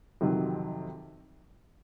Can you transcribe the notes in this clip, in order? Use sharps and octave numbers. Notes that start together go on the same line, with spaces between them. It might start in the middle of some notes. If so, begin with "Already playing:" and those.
F2 C3 D#3 F#3